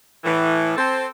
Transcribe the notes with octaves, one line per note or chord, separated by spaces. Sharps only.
A2 E3
C4 A4 C5